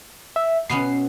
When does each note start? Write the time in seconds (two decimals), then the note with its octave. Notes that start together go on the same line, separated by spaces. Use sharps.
0.36 E5
0.69 B2 B3 C#4 C7